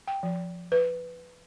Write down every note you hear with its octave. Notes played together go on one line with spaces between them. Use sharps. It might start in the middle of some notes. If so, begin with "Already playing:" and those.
G5
F3
B4